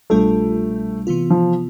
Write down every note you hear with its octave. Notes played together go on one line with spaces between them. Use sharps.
C2 B2 G3 A3 D4 F4
C3 E3 B3 F4
F3